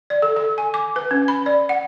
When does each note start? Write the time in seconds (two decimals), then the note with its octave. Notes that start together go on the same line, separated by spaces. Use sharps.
0.10 D5
0.22 A4
0.37 A4
0.58 G#5
0.74 D6
0.96 B4
1.11 C#4
1.28 B5
1.46 D5
1.69 F#5